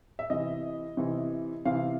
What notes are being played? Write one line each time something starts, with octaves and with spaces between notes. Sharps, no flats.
E5
C3 E3 D#5
C3 E3
C3 E3 F5